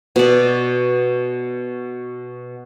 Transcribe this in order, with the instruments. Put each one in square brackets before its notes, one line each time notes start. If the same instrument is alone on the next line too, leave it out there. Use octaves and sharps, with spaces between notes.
[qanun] B2 D5